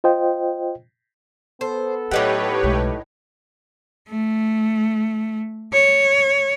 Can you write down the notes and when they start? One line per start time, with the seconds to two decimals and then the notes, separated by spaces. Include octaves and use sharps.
0.04 F4 C5 D#5 G5
1.61 B3 A4 C5
2.11 A2 F#3 D#4 G4 B4 C#5 F#5
2.63 B1 G#3 A3 A4
4.09 A3
5.73 C#5